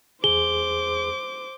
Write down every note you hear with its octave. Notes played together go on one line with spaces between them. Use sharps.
E2 G#4 C5 D6 G7